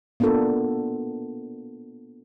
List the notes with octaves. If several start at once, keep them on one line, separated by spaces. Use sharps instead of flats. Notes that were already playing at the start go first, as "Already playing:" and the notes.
A#3 B3 D4 F4 A4 A#4